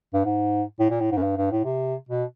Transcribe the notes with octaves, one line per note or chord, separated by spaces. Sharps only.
G2
G#2
A2
A#2
A2
G#2
F#2
G2
G2
A2
C3
B2